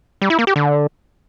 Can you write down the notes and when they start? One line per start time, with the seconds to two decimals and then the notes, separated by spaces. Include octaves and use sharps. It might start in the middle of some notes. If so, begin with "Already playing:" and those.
0.22 G3
0.30 E4
0.39 A#3
0.47 G4
0.56 D3